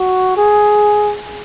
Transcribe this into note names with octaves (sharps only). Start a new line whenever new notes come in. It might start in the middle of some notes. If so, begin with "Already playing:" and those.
Already playing: F#4
G#4